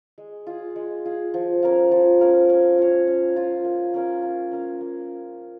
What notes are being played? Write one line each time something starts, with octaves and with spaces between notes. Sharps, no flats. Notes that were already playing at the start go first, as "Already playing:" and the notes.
G#3
F4 G#4
G#3
F4 G#4
F3
C#4 A#4 F5
F3
C#4 A#4 F5
C#4
F4 C#5
C#4
F4 C#5
A#3
C#4 A#4 F5
A#3
C#4 A#4 F5
A#3